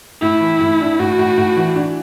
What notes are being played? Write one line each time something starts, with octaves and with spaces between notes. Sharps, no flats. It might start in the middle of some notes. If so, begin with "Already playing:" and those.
A2 E4
E3
A2
D4
A2 F#4
A2
A2
E3
D4